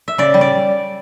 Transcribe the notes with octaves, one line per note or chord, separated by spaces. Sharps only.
E5
C#3 D5
G3
D5